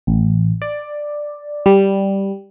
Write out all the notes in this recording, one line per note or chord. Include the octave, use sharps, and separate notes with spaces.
A1
D5
G3